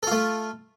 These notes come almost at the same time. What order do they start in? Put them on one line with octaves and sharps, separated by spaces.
A4 F4 A3